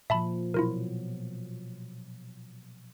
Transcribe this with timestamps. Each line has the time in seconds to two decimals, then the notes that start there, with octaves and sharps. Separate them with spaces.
0.10 A#2 F3 E5 A5 B5
0.54 B2 F#3 E4 F4 A#4